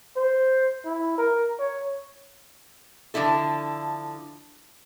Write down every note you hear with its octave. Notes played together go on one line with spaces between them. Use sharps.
C5
E4
A#4
C#5
D3 F3 D4 E4 A4